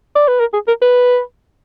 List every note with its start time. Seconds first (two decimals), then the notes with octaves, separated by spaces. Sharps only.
0.15 D5
0.28 B4
0.40 A#4
0.53 G#4
0.68 A#4
0.82 B4